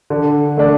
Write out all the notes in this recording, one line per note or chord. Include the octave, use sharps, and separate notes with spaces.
D3
A3 D4